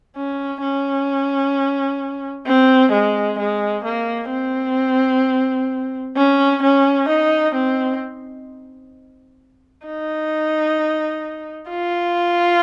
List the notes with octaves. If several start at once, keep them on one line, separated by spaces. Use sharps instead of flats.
C#4
C#4
C4
G#3
G#3
A#3
C4
C#4
C#4
D#4
C4
D#4
F4